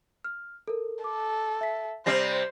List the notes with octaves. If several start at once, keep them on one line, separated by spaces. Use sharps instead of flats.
F6
A4 A#4
A4 D6
E5 B6
C3 G3 C4 C5 A#6 C7